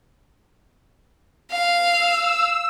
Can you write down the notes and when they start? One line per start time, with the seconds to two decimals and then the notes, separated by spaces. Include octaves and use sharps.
1.52 F5
1.89 E6